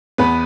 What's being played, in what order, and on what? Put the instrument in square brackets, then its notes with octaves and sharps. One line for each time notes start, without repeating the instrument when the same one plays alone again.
[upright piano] E2 B3 B4